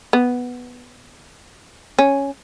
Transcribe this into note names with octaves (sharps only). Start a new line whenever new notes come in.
B3
C#4